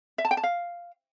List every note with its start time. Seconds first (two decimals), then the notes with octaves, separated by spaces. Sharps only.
0.18 E5
0.25 A5
0.31 G5
0.37 A5
0.43 F5